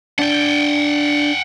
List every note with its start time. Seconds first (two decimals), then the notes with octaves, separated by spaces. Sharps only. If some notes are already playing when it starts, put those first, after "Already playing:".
0.19 D4 F#5 G5